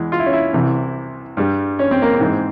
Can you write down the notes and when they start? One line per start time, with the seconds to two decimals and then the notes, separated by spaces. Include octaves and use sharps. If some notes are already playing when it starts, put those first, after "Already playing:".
Already playing: E2 E3 G#3
0.12 F4
0.19 E4
0.26 C#4
0.33 E4
0.53 C2 C3 E3
1.37 G2 G3
1.79 C#4
1.91 C4
2.02 A#3
2.15 C4
2.20 G#2 E3 G#3